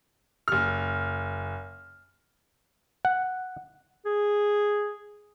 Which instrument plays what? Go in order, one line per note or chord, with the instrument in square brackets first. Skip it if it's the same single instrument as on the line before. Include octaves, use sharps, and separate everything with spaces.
[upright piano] F#1 F6
[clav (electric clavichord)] F#5
[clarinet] G#4